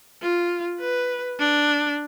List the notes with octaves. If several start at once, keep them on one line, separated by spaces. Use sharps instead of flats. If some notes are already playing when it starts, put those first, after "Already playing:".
F4
B4
D4